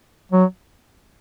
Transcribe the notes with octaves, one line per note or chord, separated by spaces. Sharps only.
F#3